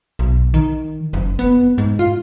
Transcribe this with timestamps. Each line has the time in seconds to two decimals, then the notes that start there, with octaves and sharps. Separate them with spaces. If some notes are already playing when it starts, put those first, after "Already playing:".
0.19 B1
0.54 D#3
1.13 F#1
1.39 B3
1.78 G#2
1.99 F4